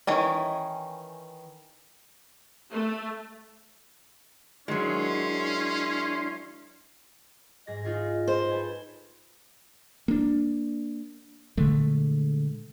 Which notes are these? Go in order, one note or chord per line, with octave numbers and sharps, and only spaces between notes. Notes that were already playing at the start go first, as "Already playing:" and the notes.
D#3 E3 C#4
A3
D#3 F#3 G#3 C#4 D4 E4 C6
G#2 G#4 D#5 A#6
D#4 F4 G#4
C5
A4 B4 G#5
A#3 D4
A#2 D3 G#3 A3